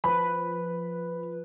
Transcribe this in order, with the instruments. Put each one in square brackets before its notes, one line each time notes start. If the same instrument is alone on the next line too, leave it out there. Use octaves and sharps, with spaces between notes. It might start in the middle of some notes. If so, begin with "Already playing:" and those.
[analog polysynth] F3 B4 [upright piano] B5